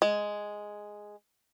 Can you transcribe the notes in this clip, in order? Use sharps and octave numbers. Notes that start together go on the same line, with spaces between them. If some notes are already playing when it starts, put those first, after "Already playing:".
G#3